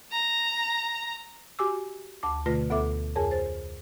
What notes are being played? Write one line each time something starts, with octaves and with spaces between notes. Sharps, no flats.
A#5
F#4 G4 G#5 D6 E6
D2 A5 D6
B2 D3 A3 F4 B4 A#6
D2 B3 A4 E5 D6
F2 G#4 A#4 C#5 G#5
C5 A6